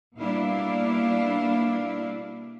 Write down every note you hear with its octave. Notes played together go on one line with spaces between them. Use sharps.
B2 G3 A#3 D4 E4 F5